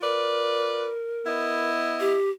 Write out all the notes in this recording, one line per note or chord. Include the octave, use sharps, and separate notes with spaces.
F4 A#4 B4 D5
B3 E4 D#5
G4